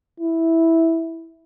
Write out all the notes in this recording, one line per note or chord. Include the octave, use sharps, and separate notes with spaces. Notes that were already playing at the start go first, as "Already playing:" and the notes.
E4